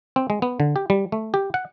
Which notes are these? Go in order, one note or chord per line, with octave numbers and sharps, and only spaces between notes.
C4
G#3
B3
D3
G4
G3
A3
G4
F#5